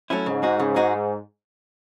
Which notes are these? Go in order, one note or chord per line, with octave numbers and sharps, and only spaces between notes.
F#3 A3 C#4 E4
G#2 C#3
G#3 D#4 F#4
C#3
G#3 D#4 F#4